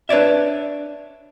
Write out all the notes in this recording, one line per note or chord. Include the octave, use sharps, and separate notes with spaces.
D4 B4 C#5 D5 E5